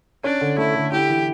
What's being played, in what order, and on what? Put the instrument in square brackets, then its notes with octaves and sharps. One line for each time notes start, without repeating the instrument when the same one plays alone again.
[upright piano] C#4 [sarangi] D4
[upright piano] D3
[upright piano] A3 [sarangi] E4
[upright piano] D3
[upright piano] E4 [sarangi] G4
[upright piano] E3